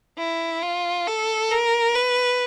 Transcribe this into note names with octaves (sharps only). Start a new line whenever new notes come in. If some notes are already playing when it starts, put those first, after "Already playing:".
E4
F4
A4
A#4
B4